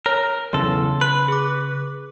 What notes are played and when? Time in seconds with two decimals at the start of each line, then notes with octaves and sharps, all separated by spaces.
0.06 A#4 C#5
0.53 B1 E2 C#3 A4 C6
1.01 B4 F#6
1.28 G#4 D6